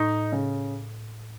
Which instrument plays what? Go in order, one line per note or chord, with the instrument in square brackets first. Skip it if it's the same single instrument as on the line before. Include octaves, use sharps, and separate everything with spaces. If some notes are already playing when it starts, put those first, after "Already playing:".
Already playing: [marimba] A2 [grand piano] D#4
[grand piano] C#3